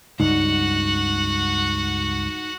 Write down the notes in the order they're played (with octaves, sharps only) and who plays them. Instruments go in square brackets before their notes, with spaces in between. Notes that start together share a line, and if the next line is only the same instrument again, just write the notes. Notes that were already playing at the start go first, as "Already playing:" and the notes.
[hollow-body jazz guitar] C#2 G2 [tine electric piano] D#4 [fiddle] F#4 F#5